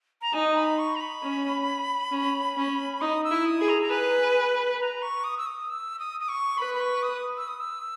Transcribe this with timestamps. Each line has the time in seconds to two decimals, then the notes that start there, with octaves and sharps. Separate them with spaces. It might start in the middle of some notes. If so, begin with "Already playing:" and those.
0.22 A#5
0.34 D#4 G#5
0.56 B5
0.79 C#6
0.96 A#5
1.00 B5
1.23 C#4
2.12 C#4
2.57 C#4
3.01 D#4 D#6
3.24 E6
3.31 E4
3.46 D#6
3.61 G#4
3.69 A#5
3.82 A#5
3.90 B4 G#5
4.80 A#5
5.02 C#6
5.24 D#6
5.38 E6
5.47 D#6
5.70 E6
5.99 D#6
6.20 D#6
6.29 C#6
6.58 B4 B5
6.74 B5
6.81 C#6
7.03 D#6
7.37 E6
7.48 D#6
7.60 E6